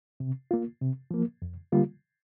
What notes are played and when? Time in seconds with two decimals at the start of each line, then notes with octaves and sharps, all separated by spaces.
0.20 C3
0.51 A#3 F4
0.81 C3
1.11 F3 A#3
1.42 F2
1.72 D3 G3 A#3 F4